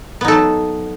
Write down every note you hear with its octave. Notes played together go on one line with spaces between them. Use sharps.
F#3 B3 D#4 A4